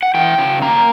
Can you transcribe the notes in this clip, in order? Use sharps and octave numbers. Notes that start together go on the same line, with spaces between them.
F#5
E3 G5
C#3
A#3 A#5